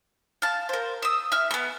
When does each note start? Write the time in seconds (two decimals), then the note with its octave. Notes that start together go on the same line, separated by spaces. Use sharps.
0.42 F5 A5
0.69 A#4 C5
1.02 D#6 E6
1.32 E5 F6
1.51 A3 B3